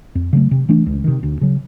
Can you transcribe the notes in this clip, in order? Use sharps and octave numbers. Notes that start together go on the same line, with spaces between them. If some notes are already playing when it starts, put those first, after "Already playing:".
F2
C#3 F#3 A3
C3
E3 A3 D4
C#2
C3 D#3
D2
C#3 F#3